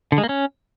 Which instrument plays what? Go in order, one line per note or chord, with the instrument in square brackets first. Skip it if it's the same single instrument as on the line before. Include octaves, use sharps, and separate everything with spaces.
[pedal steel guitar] D3
G#3
A#3
C#4